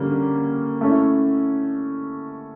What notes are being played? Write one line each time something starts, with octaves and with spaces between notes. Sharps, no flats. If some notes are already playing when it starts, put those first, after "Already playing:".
Already playing: D3 G3 A#3 C#4
A3 C#4 E4